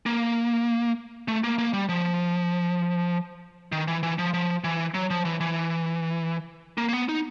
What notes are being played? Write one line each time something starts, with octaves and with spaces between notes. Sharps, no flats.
A#3
A3
A#3
A#3
G3
F3
D#3
E3
E3
F3
F3
E3
F#3
F3
E3
E3
A#3
A#3
B3
D#4